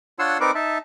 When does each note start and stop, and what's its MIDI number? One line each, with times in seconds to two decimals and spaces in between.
0.19 0.38 62
0.19 0.38 65
0.19 0.38 73
0.19 0.38 78
0.19 0.38 84
0.19 0.38 88
0.41 0.51 60
0.41 0.51 63
0.41 0.51 70
0.41 0.51 71
0.41 0.51 74
0.41 0.51 86
0.55 0.78 63
0.55 0.78 76
0.55 0.78 81